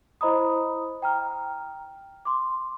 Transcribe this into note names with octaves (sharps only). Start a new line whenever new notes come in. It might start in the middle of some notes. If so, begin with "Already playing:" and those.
E4 C5 D#5 A#5 B5 D#6
G5 A#5 F6
C6 D6